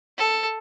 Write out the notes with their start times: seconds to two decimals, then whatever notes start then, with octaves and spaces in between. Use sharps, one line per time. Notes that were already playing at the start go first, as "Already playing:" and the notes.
0.17 A4